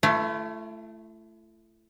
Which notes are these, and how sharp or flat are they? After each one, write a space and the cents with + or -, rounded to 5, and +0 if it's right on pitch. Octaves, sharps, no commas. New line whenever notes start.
A3 -5 E4 +45